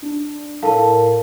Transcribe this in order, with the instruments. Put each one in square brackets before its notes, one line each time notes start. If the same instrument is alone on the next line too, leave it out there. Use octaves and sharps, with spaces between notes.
[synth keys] D4
[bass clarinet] A2 [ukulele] A4 [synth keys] A#4 [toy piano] F5 A5